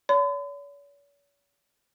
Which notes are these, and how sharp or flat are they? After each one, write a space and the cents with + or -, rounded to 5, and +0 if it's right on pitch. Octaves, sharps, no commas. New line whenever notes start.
C#5 +45 B5 +45